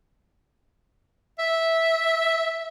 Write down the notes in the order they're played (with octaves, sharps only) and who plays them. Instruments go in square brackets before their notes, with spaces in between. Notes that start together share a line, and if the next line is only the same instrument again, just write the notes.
[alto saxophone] E5